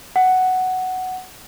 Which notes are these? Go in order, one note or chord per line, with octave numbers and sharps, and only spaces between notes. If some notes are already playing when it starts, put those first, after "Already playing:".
F#5